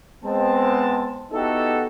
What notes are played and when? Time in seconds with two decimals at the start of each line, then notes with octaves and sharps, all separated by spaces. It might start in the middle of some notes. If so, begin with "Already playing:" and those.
0.24 G#3 B3 C4 A5
1.33 B3 D#4 E4 F#4 G4 A4